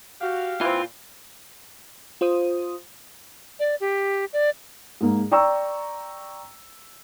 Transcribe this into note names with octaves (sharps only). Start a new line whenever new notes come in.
F#4 G4 F5
A#2 E3 C4 F4
F4 C5 D#6
D5
G4
D5
G#2 A#3
D5 G5 A#5 C#6 E6